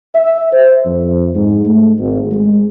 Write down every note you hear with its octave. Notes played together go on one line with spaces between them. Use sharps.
E5
C5
F2
G#2
A3
G#1
G#3